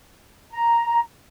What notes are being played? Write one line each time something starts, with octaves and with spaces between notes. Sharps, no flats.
A#5